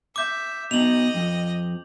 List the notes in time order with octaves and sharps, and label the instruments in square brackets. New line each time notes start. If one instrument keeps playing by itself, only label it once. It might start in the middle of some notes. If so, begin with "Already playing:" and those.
[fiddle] E5 [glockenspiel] D6 G6
[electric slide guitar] B2 D#4 [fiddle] D#5 [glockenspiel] F7 F#7
[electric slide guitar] F2